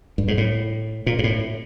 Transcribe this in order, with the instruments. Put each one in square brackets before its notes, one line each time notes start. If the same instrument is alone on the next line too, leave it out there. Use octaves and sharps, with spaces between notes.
[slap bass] G2
G#2
A2
A#2
G#2
A2